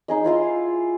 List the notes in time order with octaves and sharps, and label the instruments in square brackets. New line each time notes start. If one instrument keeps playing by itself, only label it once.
[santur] D#4 G#4 D#5
E4 F4 F5 C6